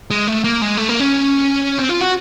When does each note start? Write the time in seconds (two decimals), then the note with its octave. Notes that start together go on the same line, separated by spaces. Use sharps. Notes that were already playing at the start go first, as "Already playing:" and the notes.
0.11 G#3
0.28 A3
0.44 A#3
0.62 G#3
0.77 A3
0.89 A#3
1.00 C#4
1.79 C4
1.90 F4
2.01 F#4